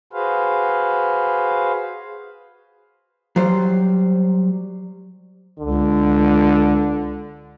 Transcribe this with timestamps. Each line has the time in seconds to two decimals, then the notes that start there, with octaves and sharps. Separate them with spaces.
0.13 F#4 G#4 B4 C5 F5
3.36 F#3 G3 C5
5.60 C#2 D3